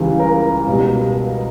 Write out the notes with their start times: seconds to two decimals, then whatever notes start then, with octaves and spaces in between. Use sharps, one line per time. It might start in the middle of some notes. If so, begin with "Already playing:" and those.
Already playing: C#2 C#3 E3 G3 B4
0.20 A#4
0.67 C#2 B2 G3